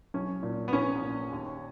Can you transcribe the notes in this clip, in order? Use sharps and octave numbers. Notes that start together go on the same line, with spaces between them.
B1 C#4
A#2
B3
A#1 C#4
A#2
D#2